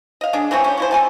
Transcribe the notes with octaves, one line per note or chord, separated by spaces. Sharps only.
D#5 F5
G#3 D4
E3 A3 C4 C#4
C#4 G4
F3 E4 C5
C4 G4 G#5 A5